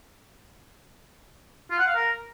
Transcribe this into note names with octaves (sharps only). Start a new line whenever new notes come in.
F4
F#5
F5
A#4